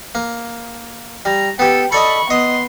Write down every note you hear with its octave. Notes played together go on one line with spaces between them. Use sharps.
A#3
G3 A#5
B3 G4 A4 G5
A4 D5 D#5 B5 C#6
B3 D#5 C6